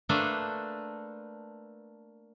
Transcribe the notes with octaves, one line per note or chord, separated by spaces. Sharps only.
A3 A#3 D4 A4 B4 C5